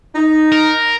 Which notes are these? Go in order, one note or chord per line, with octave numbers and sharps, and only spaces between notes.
D#4
A#4